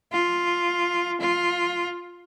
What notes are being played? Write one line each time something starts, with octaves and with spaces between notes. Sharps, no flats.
F4
F4